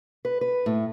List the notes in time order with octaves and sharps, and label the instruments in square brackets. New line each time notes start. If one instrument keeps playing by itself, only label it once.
[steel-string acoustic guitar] B4
B4
A2